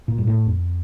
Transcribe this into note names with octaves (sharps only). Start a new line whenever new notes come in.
A#2
G2
A2
F2